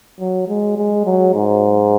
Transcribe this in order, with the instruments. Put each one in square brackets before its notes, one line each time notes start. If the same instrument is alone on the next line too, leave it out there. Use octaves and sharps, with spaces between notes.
[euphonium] F#3
G#3
G#3
F#3
G#2